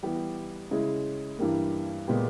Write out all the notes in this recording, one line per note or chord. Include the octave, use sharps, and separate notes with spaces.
E3 G3 B3 G4
C#3 G#3 C#4 E4
G2 E3 G3 A#3
A#2 G#3 B3 G4